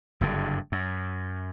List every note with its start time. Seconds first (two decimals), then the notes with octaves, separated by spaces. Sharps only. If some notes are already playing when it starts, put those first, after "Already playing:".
0.21 F#1 G2 D3
0.72 F#2